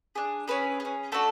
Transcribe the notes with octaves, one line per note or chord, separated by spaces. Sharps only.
D4 G#4
C#4 E4 G#4 B4
C#4 G#4
A3 D4 F#4 A4